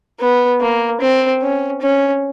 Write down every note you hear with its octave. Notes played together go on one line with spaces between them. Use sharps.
B3
A#3
C4
C#4
C#4